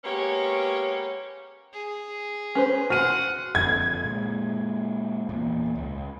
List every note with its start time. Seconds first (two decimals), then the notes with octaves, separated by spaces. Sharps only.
0.04 G#3 A#3 B3 C#4 G4 C#5
1.73 G#4
2.55 C#4 B4 C5
2.90 F#4 C5 F#5 F6 D#7
3.55 F#1 F2 D3 G#6
4.04 A#2 G#3
5.29 E2 A#2
5.75 C#2